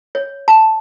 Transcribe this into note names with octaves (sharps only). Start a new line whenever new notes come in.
C#5
A5